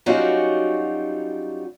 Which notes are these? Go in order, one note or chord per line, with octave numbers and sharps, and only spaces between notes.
F#3 G3 C#4 D#4 F4 F#4